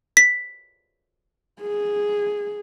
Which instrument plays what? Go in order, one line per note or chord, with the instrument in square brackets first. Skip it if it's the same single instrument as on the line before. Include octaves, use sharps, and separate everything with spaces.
[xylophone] B6
[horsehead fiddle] G#4